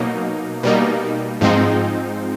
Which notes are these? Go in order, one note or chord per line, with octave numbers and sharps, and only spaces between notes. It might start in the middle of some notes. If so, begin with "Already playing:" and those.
Already playing: B2 F#3 A#3 D#4
B2 G3 A#3 D#4
G#2 F3 G#3 C4 D#4